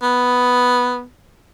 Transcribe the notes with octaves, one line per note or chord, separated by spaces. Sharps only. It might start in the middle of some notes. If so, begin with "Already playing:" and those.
B3